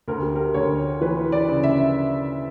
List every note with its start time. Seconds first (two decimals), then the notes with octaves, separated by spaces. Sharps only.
0.08 D2 A#4
0.22 G4
0.36 A#4
0.54 D2 C#5
1.01 E3 B4
1.32 D5
1.49 C#3
1.63 E5